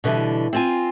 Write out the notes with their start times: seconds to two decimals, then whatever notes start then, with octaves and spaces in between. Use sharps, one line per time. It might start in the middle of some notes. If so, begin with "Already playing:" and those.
0.04 B2 D3 E3 G3
0.53 C4 F4 G#5